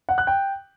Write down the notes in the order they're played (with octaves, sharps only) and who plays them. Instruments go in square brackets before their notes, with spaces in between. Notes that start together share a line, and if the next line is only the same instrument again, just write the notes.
[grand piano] F#5
F#6
G5